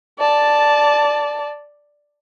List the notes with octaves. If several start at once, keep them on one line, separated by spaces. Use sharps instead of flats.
D5 A5